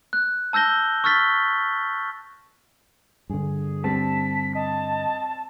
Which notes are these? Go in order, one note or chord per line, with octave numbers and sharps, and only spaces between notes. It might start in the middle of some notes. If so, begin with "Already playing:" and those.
F#6
A5 E6 G6 A#6 G7
C#6 E6 F6 A6 B6 G7
G2 D3 G#4
G3 C4 A5 B6
D#5 A5